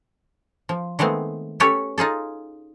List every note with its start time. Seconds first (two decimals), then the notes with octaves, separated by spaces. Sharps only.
0.69 F3
0.99 D#3 G#3 A3 B3 C4
1.60 C#4 G4 A4 B4 C#5
1.98 D#4 F4 G#4 A4